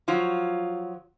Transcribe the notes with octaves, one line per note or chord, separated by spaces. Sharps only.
F3 F#3 F4